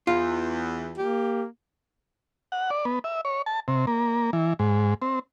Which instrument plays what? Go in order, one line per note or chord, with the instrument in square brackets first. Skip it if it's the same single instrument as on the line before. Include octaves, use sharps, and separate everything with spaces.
[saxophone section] E2 [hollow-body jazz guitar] F4
[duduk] A#3 [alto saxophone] G4
[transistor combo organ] F#5
D5
B3
E5
C#5
A5
C3
A#3
E3
G#2
C4